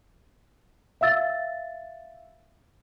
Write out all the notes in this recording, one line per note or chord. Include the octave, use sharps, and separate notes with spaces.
E5 F5 E6 A6